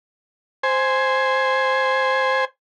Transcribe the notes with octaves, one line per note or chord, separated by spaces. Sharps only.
C5 G#5